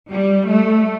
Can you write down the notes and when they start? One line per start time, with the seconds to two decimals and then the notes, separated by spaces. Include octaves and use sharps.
0.10 G3
0.50 A3